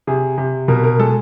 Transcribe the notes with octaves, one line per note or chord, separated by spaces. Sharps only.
C3 G#4
C3
B2 A#4
A#4
G#3 A4